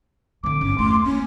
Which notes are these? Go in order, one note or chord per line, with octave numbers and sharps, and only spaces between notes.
D3 C4 D6
G1 C#4
E2 A3 C6
A#3 C#4